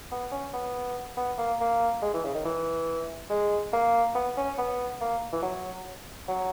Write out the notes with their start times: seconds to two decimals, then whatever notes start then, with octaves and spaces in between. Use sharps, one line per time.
0.11 B3
0.32 C#4
0.53 B3
1.17 B3
1.38 A#3
1.60 A#3
2.02 G#3
2.14 E3
2.24 C#3
2.35 D#3
2.45 E3
3.30 G#3
3.73 A#3
4.15 B3
4.37 C#4
4.58 B3
5.01 A#3
5.33 E3
5.43 F#3
6.28 F#3